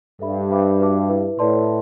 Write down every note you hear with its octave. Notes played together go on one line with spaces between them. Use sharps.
G2 A4 E5 B5
C5 E5 B5 D6
F#4 B4 E5 A5 D6
E4 B4 E5
A2 E4 B4 D5 A5 C6